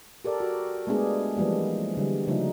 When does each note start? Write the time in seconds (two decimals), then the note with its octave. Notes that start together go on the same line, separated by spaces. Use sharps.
0.24 G4 A4 A#4 D5
0.40 F#4
0.87 G#3 A3 B3 D4 G#4
1.37 E3 F3 G3 G#3 A#3
1.97 D3 G3
2.27 C#3 F3 F#3 A3 D#4